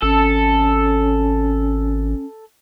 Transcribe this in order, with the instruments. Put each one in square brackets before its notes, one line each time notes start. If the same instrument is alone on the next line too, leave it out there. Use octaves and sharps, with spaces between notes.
[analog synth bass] G#1 [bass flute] C#4 [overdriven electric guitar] A4